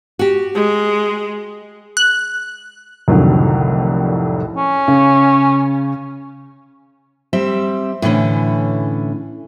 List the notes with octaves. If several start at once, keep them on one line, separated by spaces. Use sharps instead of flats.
F#4 G4
G#3
F#6
C2 F2 A2 D3 D#3 F#3
C#4
C#3
G3 C4 E5
A2 D3 E3 C#4